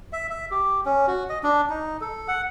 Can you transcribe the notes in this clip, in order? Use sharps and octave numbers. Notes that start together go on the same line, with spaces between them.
E5
E5
G4
C#4
F#4
D#5
D4
D#4
A4
F#5